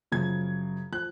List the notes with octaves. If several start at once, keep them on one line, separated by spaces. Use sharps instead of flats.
F#2 C#3 F3 G#6
F3 F#6